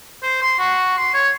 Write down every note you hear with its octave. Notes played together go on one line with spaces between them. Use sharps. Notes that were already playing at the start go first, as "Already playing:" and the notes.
C5
C6
F#4
C6
C#5